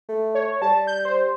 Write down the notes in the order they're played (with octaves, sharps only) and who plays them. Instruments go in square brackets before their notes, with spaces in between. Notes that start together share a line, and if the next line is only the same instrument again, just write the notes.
[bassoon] A3
[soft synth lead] C#5
[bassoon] G3 [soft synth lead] A5
[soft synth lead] G6
C5